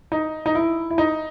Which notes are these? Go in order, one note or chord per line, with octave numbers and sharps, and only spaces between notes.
D#4
D#4
E4
E4
D#4